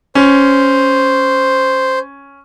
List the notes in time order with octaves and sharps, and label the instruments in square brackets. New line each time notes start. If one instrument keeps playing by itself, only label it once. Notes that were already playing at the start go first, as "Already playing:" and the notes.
[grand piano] C#4 [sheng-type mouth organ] C5